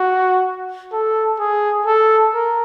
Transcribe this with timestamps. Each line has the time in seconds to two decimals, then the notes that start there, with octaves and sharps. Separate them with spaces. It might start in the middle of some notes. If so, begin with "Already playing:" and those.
Already playing: F#4
0.92 A4
1.39 G#4
1.86 A4
2.34 A#4